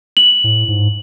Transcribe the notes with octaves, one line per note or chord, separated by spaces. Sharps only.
F#7
A2
G#2